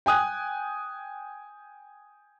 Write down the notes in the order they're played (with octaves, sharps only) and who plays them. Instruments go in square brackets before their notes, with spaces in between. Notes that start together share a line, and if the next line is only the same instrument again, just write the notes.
[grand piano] G5 G#5 D#6 F#6